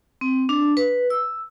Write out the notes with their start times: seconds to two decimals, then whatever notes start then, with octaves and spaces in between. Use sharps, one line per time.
0.21 C4
0.49 D4
0.77 B4
1.10 E6